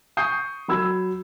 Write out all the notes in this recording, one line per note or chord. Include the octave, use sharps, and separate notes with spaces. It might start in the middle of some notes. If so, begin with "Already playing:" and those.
C#6 D#6 G6 C7
F#3 B5 E6 G#6